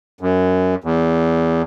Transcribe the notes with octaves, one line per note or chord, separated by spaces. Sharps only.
F#2
E2